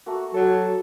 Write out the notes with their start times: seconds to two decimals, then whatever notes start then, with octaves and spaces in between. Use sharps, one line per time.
0.06 A3 A#3 F#4
0.34 F#3 A4